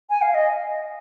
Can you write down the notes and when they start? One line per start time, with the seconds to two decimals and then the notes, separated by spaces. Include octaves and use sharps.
0.10 G#5
0.22 F5
0.34 D#5